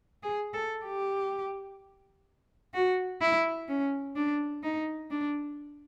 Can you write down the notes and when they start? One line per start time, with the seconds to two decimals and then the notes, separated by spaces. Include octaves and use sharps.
0.23 G#4
0.53 A4
0.85 G4
2.74 F#4
3.22 E4
3.68 C#4
4.16 D4
4.63 D#4
5.10 D4